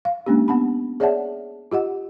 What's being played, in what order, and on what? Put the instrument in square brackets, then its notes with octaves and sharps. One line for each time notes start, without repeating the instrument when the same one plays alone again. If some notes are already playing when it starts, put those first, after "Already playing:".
[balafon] F5
G#3 A#3 C#4 D4 G4
B3 F#5 A5 B5
G#4 C#5 D5 E5 F#5 A5
F4 G4 D#5 F#5